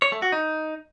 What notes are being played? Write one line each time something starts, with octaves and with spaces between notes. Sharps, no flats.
C#5
A3
F#4
D#4